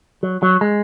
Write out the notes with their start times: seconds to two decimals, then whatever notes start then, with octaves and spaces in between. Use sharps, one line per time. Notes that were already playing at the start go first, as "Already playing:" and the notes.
0.23 F#3
0.43 F#3
0.61 G#3